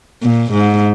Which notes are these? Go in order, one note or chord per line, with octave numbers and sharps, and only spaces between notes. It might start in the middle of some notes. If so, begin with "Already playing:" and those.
A#2
G#2